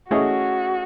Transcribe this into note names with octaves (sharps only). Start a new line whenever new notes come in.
A3 C#4 E4 F#4 G#4 D#5